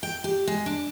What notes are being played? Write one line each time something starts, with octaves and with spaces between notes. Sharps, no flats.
G5
G4
G#3
D4